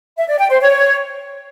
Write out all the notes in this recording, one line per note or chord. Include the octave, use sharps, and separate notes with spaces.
E5
D5
G5
C5
C#5